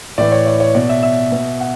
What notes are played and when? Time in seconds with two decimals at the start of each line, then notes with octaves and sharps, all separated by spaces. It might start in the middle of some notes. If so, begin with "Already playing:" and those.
0.18 A2 E3 D5
0.32 C#5
0.47 D5
0.60 C#5
0.75 B2 D5
0.89 E5
1.03 E5
1.32 B2
1.61 F#5